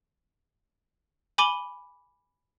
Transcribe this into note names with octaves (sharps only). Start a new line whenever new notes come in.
G#5 B5 D6 D#7 F#7 G7